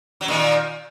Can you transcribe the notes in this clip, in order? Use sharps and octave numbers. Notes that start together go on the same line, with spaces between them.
F#3
A#2 D#3